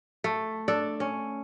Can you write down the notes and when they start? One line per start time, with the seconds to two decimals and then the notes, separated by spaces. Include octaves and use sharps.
0.24 A3
0.68 D4 A4
1.00 C#4